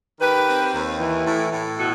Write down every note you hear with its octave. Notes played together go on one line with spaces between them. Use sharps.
D#3 G4 B4
C4
D#2
E3
A2
A2
B2 F#4 A4